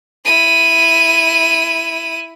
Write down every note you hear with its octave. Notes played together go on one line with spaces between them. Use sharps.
E4 D#7